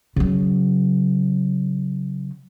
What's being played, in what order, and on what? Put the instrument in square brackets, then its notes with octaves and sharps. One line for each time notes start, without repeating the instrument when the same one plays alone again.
[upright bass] C#3 F#3